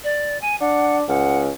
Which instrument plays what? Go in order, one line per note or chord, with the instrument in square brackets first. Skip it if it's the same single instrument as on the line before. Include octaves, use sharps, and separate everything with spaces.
[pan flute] D5
G#5
[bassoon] D4 [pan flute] F#5
[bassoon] C#2 [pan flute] F#5